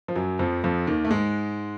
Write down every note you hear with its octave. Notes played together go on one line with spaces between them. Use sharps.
F3
F#2 F#3
F2 F3
F2 F3
D#2 D#3
A3
G#2 G#3